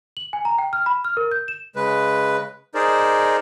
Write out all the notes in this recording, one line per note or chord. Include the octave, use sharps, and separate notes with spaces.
F#7
G#5
A#5
G5
F6
B5
F6
A#4
G6
E7
C#3 G#3 B4
D#4 G#4 A#4 C5 D5